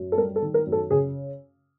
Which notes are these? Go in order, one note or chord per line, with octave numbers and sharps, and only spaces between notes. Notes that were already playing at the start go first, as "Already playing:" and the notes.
Already playing: F#2
A4
G3 A#4
A4
D#3
A#4
F#2
A4
C#3 G#4